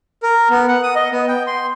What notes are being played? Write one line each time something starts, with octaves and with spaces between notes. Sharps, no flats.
A#4
B3
F#5
D#6
D#5
B3
G5
C6